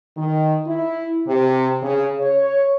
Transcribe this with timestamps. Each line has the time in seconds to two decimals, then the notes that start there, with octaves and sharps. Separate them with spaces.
0.16 D#3
0.67 E4
1.27 C3
1.82 C#3
2.20 C#5